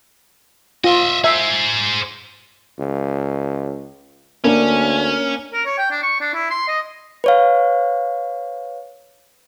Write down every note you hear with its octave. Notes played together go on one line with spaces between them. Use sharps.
F4 D#5 E5
G#4 C5 E5
C#2
D2 A#3 C#4 D4
A#4
C#5
G5
D4
C#6
D4
E4
C6
D#5
B4 C#5 F5